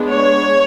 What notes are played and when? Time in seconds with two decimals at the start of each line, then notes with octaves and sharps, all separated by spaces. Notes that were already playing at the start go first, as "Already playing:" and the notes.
Already playing: G#3 B3 D4
0.10 C#5